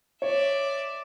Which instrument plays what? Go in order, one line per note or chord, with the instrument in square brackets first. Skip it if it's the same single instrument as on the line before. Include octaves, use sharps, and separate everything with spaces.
[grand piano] C#5 [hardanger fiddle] D5 E5